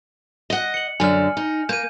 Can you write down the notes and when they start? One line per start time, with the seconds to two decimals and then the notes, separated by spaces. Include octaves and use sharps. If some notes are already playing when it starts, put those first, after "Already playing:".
0.50 D#5 F#5
0.74 C#7 F#7
1.00 F#2 D3 G#5 F6
1.37 D#4
1.69 A#3 G6 D#7